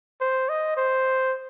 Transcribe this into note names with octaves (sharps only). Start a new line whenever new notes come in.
C5
D#5
C5